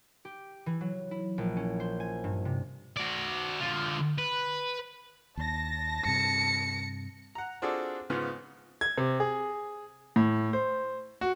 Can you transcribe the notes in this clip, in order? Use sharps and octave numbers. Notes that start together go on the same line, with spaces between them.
G4
E3
F#3
E4
A#1
C#4
C5
G#5
G2
C3
F#4 D5
D3 F4
B4
D#2 A5 A#6
G2 C3 C#7
F#5 A#5
C4 D4 F4 F#4 G#4 A4
G#2 C#3 B3 F4
G#6
C3
G#4
A2
C5
F#4